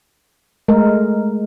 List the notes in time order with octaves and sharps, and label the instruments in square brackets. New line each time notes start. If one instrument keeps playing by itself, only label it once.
[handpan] G#3 A3 A#4